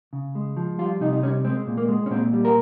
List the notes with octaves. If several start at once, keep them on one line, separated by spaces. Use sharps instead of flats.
C#3
G#3
F3
G3 F4
C3 D#4
D#4
G3 C#4
G#3 C4
A#2
A#3
G#3
C#4
A#2 C4
G3
A#4